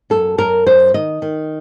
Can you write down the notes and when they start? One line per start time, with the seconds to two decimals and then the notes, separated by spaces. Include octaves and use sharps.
0.10 F#2 A4
0.38 F#2 A#4
0.66 F#2 C5
0.94 D#3 D#5
1.22 D#3